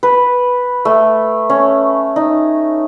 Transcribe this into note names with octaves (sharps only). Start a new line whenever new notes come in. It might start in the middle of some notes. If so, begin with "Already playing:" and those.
B4
A3
C#4
D#4